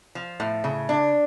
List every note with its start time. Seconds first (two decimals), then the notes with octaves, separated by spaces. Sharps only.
0.15 F3
0.40 A2
0.64 C#3
0.89 D4